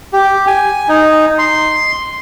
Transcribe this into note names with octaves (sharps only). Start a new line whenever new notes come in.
G4
G#5
D#4
C6